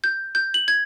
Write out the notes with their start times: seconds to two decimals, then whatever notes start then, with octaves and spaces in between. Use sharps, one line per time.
0.04 G6
0.35 G6
0.54 F#7
0.68 G#6